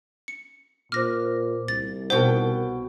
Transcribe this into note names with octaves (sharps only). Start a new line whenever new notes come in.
C#7
A#2 C5 D6 F6 A#6
C2 A6
B2 D#4 A#4 C5 F#5 G5